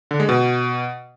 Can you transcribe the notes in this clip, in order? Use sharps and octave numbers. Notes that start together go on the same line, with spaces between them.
D3
G#3
B2